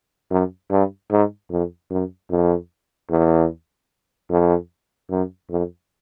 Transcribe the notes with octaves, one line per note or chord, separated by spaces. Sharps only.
F#2
G2
G#2
F2
F#2
F2
E2
F2
F#2
F2